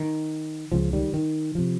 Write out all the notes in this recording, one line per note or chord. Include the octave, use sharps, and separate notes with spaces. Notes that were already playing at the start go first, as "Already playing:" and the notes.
Already playing: D#3
C#2 C#3 F3
D#3 G3
D#3
C3 F3